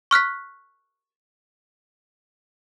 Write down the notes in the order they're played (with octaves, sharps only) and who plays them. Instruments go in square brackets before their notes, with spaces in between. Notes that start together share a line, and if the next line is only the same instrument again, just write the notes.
[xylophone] C#6 F6 F#6 B6